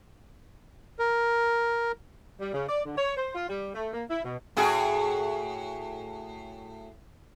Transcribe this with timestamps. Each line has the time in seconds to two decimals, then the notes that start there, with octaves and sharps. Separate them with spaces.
0.99 A#4
2.40 G3
2.53 C#3
2.68 D5
2.85 D3
2.97 C#5
3.17 C5
3.35 F4
3.49 G3
3.74 A3
3.93 A#3
4.10 E4
4.25 B2
4.57 A2 F#4 G#4